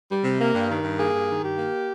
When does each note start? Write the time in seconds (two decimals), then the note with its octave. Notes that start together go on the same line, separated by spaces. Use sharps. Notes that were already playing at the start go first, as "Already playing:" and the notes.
0.09 G3
0.24 C3
0.38 A#3
0.54 G2
0.69 D#3
0.83 G2
0.98 A#3 G#4
1.13 G2
1.28 D#3
1.43 G2 G4
1.58 A#3